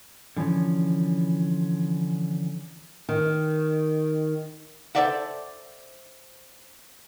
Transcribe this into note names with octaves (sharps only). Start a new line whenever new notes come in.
D3 E3 F3 C#4
D#3
A4 A#4 C5 D5 E5 F#5